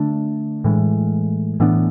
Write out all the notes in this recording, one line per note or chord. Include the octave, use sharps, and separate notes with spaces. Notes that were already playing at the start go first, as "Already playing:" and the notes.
Already playing: D3 A3 D4
A2 E3 G#3
A2 E3 B3 D4